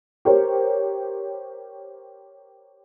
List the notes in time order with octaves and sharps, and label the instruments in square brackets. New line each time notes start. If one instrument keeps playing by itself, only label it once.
[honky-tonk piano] G4 A#4 C5 C#5